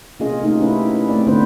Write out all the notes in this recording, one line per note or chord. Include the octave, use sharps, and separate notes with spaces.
C3 A#3 C#4 F4 G#4 D#5
A3 D#4 F4 G4
C#4 E4 F4 G4 B4
A3 C4 D5
D3 A3 B3 D4 B4 C5